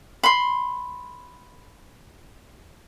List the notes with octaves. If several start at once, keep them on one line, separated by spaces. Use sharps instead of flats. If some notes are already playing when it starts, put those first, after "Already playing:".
B5 C6